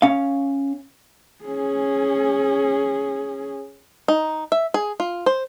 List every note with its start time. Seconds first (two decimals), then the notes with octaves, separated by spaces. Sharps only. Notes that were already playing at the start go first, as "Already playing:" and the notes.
0.02 C#4 F5
1.44 C#4 G#4
4.08 D#4
4.52 E5
4.74 G#4
5.00 F4
5.26 C5